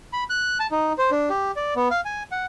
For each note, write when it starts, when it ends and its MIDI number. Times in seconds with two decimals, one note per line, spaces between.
0.13 0.24 83
0.30 0.58 90
0.60 0.67 81
0.71 0.93 63
0.98 1.10 72
1.11 1.29 62
1.30 1.51 67
1.56 1.74 74
1.76 1.88 59
1.91 2.01 77
2.05 2.23 80
2.32 2.46 78